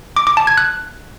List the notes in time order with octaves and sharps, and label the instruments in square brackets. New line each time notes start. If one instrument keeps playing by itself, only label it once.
[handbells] D6
D6
A5
G#6
F#6